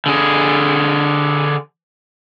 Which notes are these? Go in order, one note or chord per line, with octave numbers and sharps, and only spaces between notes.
D3 G#4